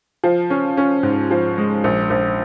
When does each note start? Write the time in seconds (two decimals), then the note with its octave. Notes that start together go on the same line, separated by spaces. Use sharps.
0.24 F3
0.50 C#4
0.77 C#4
1.03 G#2
1.31 F3
1.58 G#3
1.84 A#1
2.10 A#1